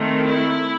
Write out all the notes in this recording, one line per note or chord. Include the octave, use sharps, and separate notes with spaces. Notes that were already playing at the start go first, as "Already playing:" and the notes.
Already playing: D#3 A3 C4
E4